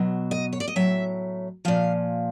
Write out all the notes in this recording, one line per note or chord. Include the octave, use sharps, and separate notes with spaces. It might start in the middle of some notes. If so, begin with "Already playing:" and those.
Already playing: B2 F#3
D#5
C#5
D5
D#5
A2 F#3 E5
A#2 F3 F5